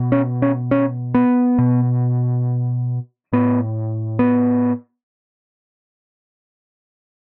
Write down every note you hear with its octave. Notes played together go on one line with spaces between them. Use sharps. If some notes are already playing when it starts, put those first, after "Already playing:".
Already playing: B2
C#4
C#4
C#4
B3
B2
A2 B3
B3